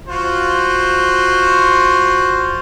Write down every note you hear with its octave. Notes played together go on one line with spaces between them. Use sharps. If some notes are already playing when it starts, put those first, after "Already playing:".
F4 F#4 C5